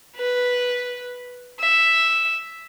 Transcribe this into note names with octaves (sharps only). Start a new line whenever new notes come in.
B4
E5